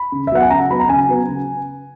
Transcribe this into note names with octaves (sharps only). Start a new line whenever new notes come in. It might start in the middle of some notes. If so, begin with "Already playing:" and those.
Already playing: B5
C#3
E5
F#3 B3 F#5
G#5
C#3 A#5
F#3 B3 B5
A#5
C#3 G#5
F#3 B3
C#3